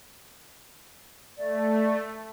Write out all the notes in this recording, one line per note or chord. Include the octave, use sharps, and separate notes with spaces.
A3 D5